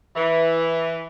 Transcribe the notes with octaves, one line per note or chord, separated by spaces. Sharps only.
E3